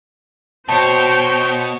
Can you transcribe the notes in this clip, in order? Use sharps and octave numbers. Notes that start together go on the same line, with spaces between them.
B2 F#4 C5 C#5 G5 A5